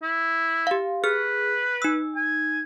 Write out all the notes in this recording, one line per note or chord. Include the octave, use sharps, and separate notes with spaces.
E4
G4 F5
G#4 B4 F6
D#4 E6
G#5